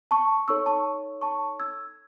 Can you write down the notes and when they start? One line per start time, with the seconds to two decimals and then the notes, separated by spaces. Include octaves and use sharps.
0.11 A5 C#6
0.48 D#4 A4 C#5 C#6 E6
0.66 A5 C#6
1.21 A5 C#6
1.60 E6 G#6